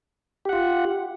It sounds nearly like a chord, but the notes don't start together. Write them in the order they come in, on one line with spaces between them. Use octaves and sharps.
G4 F#5 F4